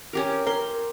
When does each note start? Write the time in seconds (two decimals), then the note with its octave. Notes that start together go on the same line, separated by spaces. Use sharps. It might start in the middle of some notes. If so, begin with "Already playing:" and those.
0.13 C#4 G4 A#4
0.47 A#4 C6